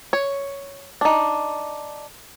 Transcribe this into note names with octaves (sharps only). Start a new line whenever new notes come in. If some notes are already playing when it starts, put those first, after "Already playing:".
C#5
D4 D#4